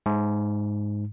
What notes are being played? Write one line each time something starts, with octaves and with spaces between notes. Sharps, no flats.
G#2